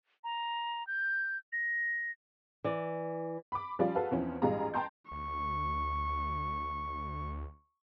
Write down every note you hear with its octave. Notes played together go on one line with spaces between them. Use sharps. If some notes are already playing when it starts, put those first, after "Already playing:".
A#5
G6
A#6
E3 D5
B5 D6
F3 G3 C#4 F4 D5
F#4 G#4 A4 B4 F5
E2 F3 C4 C#4 E4
A1 G#2 G3 F4 G#4 A#5
G5 A5 A#5 C6 G6
D2 C#6